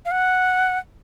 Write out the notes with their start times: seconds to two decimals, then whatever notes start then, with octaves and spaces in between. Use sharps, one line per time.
0.05 F5
0.11 F#5